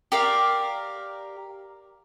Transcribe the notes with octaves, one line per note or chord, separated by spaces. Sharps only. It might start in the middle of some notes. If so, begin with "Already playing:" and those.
G4 A#4 D5 F5